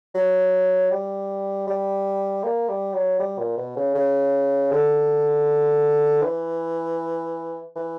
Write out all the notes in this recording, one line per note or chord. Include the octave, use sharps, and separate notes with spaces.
F#3
G3
G3
A#3
G3
F#3
G3
A#2
B2
C#3
C#3
D3
E3
E3